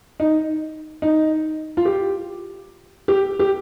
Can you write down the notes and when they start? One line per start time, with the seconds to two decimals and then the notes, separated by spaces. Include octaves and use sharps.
0.20 D#4
1.02 D#4
1.77 F4
1.85 G4
3.08 G4
3.39 G4